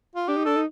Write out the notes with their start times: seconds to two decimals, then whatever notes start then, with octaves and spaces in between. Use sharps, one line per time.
0.16 F4
0.28 D4 G4
0.37 D#4
0.45 D4 A4
0.56 D#4